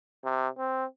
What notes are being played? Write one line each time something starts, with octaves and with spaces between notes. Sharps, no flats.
C3
C4